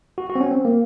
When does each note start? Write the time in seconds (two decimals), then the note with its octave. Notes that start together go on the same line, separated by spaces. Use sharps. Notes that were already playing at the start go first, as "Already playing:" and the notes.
0.18 F#4
0.30 F#4
0.35 C4
0.40 C#4
0.51 C4
0.65 A#3